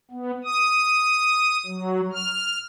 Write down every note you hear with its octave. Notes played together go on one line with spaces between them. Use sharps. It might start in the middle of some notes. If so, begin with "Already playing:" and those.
B3
D#6
F#3
F6